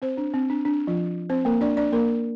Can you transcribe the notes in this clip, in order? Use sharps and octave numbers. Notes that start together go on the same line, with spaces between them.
C4 C5
D4
C4
D4
D4
F3 F4
C4 C5
A#3 A#4
D4 D5
D4 D5
A#3 A#4